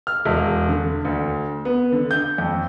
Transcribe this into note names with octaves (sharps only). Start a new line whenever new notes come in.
F6
E1
D3
D2
B3
D3
G6
F2